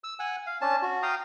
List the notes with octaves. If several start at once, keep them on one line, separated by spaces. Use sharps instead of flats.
E6
F#5 G#5
F5
C#4 D4 A5
F#4
F5 G5 A#5 D#6